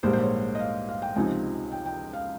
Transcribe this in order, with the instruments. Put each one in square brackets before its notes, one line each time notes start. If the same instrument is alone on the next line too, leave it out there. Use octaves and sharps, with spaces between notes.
[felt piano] A#1 G#2 G3 A#3 C5
C5
C#5
D#5
F5
F5
G5
C#2 C3 F3 C4 D#4 G#5
G5
G5
F5